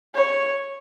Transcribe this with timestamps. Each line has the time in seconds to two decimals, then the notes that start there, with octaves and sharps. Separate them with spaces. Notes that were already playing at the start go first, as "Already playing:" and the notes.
0.15 C#5